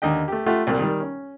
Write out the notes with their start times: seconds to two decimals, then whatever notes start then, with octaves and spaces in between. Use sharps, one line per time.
0.02 D#2 D3 D#5 G5
0.28 A3 G4
0.46 A3 F4 G4 F#5
0.67 C2 A#2
0.79 D#3 G3
1.00 C#4